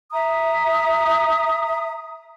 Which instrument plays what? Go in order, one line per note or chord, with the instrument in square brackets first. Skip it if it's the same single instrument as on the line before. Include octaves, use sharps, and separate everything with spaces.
[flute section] E5 A#5 D#6